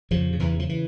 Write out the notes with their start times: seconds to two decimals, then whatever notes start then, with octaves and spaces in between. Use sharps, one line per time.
0.11 F2 C#3 F3
0.33 C#3
0.40 E2 E3
0.54 C#3
0.59 F3
0.69 E3